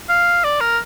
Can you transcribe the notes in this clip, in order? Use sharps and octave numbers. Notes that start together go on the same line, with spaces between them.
F5
D5
A#4